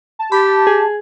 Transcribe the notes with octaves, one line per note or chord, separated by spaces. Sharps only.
A5
G4 B5
G#4